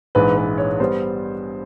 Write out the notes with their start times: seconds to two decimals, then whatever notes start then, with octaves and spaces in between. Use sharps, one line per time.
0.15 A#1 G#2 E3 G#3 B4
0.37 B4
0.58 C#5
0.80 G3 B3 C5